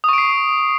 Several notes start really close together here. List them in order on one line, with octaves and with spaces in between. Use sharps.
D#6 C#6 D7 C7